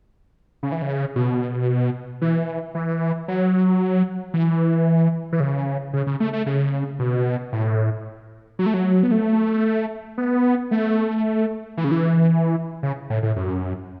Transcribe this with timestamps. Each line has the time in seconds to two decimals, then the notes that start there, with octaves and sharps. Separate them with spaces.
0.63 C#3
0.72 E3
0.82 C#3
1.16 B2
2.22 E3
2.75 E3
3.28 F#3
4.34 E3
5.32 E3
5.40 C#3
5.93 C#3
6.07 C#3
6.20 A3
6.33 A3
6.46 C#3
6.99 B2
7.53 A2
8.59 F#3
8.66 A3
8.74 F#3
9.03 B3
9.11 A3
10.18 B3
10.71 A3
11.77 E3
11.84 C#3
11.91 E3
12.83 C#3
13.10 A2
13.23 A2
13.36 F#2